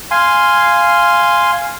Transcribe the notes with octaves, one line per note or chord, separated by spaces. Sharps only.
F5 G#5 C6